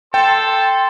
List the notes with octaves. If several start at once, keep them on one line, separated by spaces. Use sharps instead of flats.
A4 G5 C6